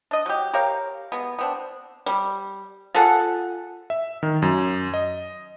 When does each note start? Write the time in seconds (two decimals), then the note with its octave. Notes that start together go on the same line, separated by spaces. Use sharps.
0.11 D4 D#5
0.26 F#3 G4
0.54 G4 A#4 C#5 F5
1.12 G#3 B3
1.39 B3 C4 D4
2.06 G3
2.95 F4 G#4 A4 F#5
3.90 E5
4.23 D#3
4.42 F#2
4.94 D#5